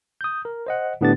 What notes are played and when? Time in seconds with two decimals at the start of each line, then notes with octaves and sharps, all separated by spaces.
0.21 D#6 G6
0.45 A#4
0.67 C5 D#5 F#5
1.01 A2 D3 B3 D4 G4 A6